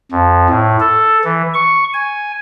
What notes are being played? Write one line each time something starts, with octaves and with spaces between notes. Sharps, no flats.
F2
A2
A4
E3
C#6
G#5